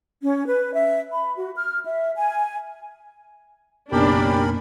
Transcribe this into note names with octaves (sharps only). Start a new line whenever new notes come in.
C#4
B4
E5
B5
F#4
F6
E5
G#5
F#1 B1 C#4 D4 G4 A#4 B5